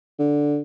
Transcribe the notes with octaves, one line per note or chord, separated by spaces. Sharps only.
D3